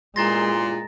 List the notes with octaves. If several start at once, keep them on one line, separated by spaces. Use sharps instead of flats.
E2 G2 A#2 G#3 A#5 C6 A6 A#6